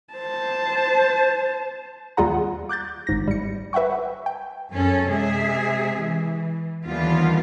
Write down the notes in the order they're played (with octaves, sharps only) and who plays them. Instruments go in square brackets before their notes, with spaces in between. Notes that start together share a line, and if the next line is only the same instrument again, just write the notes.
[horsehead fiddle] C5 A5
[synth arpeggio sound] D#2 G3 F4 G#4 F#5 A#5
D6 F#6 G6 A6
G#1 G#2 A#6
G3 C#7
B4 E5 F#5 G5 C#6
G5
[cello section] F#2 C#4 A4
C3 G#3 G#4 E5
E3
D#2 D3 E3 G3 B3 F4